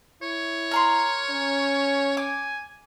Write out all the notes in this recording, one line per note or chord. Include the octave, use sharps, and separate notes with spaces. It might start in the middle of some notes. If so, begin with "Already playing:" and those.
E4 C#5
A#4 A#5 C6
C#4
G#5 D6